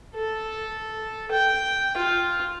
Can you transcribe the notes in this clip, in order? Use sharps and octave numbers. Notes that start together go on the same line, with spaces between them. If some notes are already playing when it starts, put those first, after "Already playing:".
A4
G5
F4